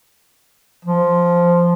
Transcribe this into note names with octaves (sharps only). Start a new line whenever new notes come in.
F3